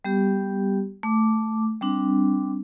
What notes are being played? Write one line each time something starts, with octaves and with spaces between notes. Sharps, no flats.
G3 B3 G4
A3 D6
G3 C4 D4